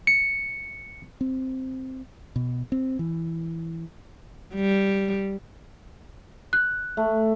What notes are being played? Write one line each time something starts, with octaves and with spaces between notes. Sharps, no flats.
C#7
C4
B2
C4
E3
G3
F#6
A3